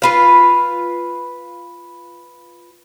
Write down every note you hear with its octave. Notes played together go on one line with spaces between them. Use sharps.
F4 B4 F5